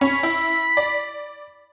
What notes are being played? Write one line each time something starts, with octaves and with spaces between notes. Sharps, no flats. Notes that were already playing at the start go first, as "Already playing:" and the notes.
C#4 B5
E4
D5